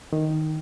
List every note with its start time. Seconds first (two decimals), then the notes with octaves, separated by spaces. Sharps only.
0.13 D#3